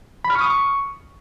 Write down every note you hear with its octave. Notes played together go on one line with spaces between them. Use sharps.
B5
F6
C#6
D#6
C#6